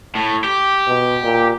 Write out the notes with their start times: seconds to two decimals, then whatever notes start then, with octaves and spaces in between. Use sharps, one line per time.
0.15 A2
0.44 G4
0.87 B2
1.24 A#2